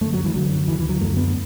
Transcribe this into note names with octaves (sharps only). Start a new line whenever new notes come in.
F#2 D3 A3
F#3
E3
F#2 D3 F#3
D2 D3 E3
E3
F#3
F#2 D3 A3
B3